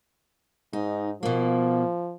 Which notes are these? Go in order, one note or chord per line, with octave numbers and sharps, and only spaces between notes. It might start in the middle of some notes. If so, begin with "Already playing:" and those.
G#2 D#4
B2 F3 A#3